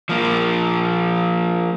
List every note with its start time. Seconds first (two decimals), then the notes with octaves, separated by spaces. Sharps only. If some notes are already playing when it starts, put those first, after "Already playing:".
0.09 F3 A#3